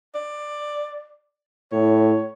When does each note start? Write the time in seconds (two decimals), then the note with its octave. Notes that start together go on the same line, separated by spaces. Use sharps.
0.15 D5
1.72 A2 C#5